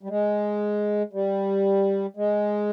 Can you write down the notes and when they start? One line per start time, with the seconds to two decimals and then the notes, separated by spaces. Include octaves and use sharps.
0.03 G3
0.09 G#3
1.13 G3
2.17 G#3